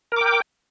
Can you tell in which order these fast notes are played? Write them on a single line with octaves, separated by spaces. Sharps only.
A#4 D6 G5